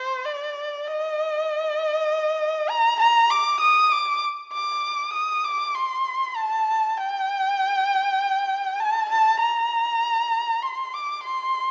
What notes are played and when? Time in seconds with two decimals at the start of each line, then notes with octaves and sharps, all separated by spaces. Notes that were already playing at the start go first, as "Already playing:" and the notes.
Already playing: C5
0.25 D5
0.87 D#5
2.70 A#5
3.01 A#5
3.31 D6
3.61 D#6
3.92 D6
4.53 D6
5.14 D#6
5.45 D6
5.75 C6
6.36 A5
6.97 G5
8.80 A5
9.10 A5
9.41 A#5
10.63 C6
10.94 D6
11.24 C6